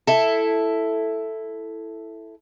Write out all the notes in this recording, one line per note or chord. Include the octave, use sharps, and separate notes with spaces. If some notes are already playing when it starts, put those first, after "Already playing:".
E4 A4